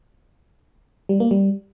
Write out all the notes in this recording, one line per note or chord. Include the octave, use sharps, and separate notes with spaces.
G3
A#3
G3